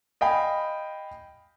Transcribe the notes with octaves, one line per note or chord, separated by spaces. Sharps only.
D#5 F5 G5 G#5 B5